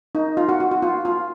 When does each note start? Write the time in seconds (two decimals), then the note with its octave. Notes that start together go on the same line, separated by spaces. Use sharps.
0.15 D#4
0.37 F4
0.49 F#4
0.60 F#4
0.71 F#4
0.82 F4
1.05 F4